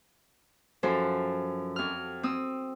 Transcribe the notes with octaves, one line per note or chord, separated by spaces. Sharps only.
F#2 F3 A4 C5
F2 F6
C4 D#6 E6